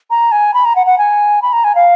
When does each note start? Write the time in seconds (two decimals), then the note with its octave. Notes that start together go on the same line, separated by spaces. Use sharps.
0.10 A#5
0.32 G#5
0.54 B5
0.65 A#5
0.76 F#5
0.86 F#5
0.98 G#5
1.42 B5
1.53 A#5
1.64 G#5
1.75 F5